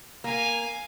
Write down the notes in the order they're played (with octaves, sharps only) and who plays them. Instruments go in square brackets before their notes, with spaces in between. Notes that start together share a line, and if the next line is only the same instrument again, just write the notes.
[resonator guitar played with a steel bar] A#3 [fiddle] F5 G#5